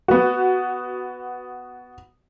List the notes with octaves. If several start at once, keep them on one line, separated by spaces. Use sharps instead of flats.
B3 F#4